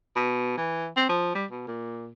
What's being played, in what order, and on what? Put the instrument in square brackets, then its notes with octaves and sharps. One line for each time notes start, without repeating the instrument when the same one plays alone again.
[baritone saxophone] B2
E3
C4
F3
G3
B2
A#2